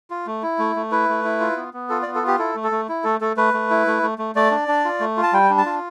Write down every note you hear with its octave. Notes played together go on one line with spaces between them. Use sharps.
F4
A3
E4
A3
A3
E4 B4
A3
E4
F4
B3
B3
F4 A4
D5
B3
A4
F4 G4
E4 A4
A3
A4
A3
E4
A3 A4
A3 A4
A3 B4
A3
E4
A3
A3
A3
A3 D5
D4
D4
F4
A3
F4
A5
G3 G5
D4
A5
F4